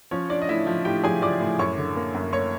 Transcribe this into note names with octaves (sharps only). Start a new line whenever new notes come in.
F3 C#4 C#5
C#4 D4 D5
D#5
A2 E4 E5
F3
A2 G4 G5
F3 G#4 G#5
F3 D5 D6
A2
F#2 C#5 C#6
D3
A#3
F#2
A#3 C#5 C#6